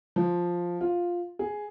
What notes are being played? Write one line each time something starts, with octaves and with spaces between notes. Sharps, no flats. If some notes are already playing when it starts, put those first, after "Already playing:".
F3
F4
G#4